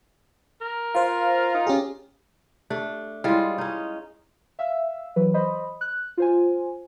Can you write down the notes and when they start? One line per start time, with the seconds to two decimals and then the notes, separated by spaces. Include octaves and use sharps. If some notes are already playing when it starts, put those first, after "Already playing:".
0.61 A#4
0.95 F4 C5 F5
1.54 D#4
1.67 C#4 G4 G#4
2.70 A3 D4 G4
3.24 G3 G#3 E4 F4 C#5
3.58 C#4 D#4
4.59 E5 F5 E6
5.16 E3 F#3 B4
5.34 C5 D#5 B5
5.81 F#6
6.17 F4 C5 G#5